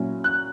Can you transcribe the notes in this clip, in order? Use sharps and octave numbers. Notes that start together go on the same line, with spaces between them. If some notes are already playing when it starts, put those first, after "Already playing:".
Already playing: A#2 F#3 C#4 E4
F#6